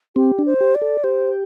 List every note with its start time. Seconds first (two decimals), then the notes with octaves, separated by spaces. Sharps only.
0.16 C4 G4
0.39 D4
0.46 C5
0.61 G4
0.75 D5
0.82 A4
1.04 G4 C5